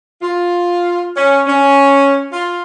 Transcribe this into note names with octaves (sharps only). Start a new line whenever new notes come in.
F4
C#4
C#4
F4